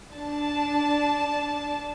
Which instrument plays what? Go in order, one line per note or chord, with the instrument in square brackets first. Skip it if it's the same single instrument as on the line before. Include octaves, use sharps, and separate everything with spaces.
[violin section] D4 A5